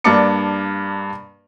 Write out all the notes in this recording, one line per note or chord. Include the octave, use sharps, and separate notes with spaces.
G2 A#3 D4 A5 D6 C#7